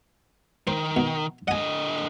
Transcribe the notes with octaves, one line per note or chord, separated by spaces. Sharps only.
D#3 C5
B2
D3 D#5 F#5 G#5